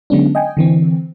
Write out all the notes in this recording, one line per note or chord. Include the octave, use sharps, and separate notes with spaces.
D3 F#3 G#3 B3 C#4 D4
D#5 G5 G#5
D3 E3 C4